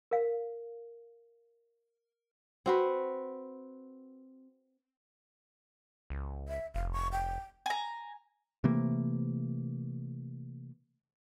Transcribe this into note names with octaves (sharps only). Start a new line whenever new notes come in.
A#4 F5
C4 F#4 B4
C#2
E5
F1 F5
C#6
G5
G#5 A#5
C3 E3 A3 A#3